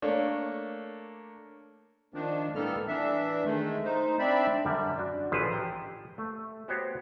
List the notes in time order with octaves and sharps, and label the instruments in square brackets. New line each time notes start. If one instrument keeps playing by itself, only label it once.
[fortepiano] A3 A#3 D4 C#5
[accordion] D#3 F3 D4
A2 G3 A#3 B3 A4 F6
E3 D4 E5
D#3 G#3 A3
D#4 C5
C4 D4 D5 E5 B5
[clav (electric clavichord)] F#2 D3 G3
D4 F#4
A1 E3 F3 G#4 B4 A5
G4 G5 A#5
A3
B3 F#4 G4 C5 C#5